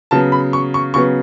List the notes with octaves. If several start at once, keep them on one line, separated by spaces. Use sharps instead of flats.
C#3 F#3 B3 A5
B5
C#6
C#6
C#3 F#3 B3 C#6